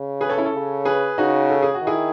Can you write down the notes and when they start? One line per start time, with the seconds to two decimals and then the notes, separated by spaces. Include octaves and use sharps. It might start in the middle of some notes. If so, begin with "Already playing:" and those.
Already playing: C#3
0.21 G#4 B4
0.29 A4 C#5
0.38 C#4 E4
0.45 A4 C#5
0.53 C#3
0.85 G#4 B4
1.18 C#3 D#4 F#4
1.50 A4
1.62 G#4
1.74 F#4
1.82 D#3 E4 G#4